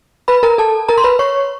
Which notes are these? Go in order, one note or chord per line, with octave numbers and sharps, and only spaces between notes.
B4 B5
A#4 A#5
A4 A5
A#4 A#5
C6
B4 B5
C#5 C#6